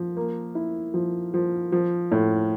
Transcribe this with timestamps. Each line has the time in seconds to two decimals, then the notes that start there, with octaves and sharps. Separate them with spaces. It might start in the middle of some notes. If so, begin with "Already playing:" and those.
Already playing: F3
0.17 A#3
0.55 E4
0.94 F3
1.34 F3
1.72 F3
2.12 A2